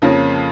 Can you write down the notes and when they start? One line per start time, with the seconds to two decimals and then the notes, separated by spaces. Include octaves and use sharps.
0.02 F2 C#3 F3 A#3 C#4